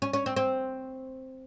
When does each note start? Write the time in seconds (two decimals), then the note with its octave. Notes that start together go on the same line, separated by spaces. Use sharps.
0.02 C#4
0.13 C#4
0.26 C4
0.36 C4